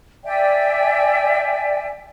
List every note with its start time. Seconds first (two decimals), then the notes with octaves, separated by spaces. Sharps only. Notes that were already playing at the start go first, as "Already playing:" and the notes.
0.24 D5 E5 G5 G#5